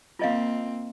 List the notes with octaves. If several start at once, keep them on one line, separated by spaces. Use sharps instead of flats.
A#3 C4 F4 D#5 F5